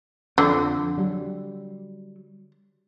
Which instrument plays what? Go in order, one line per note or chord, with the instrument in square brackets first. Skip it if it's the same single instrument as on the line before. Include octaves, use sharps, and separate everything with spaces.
[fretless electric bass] F2 [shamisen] D3
[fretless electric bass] F#3 G3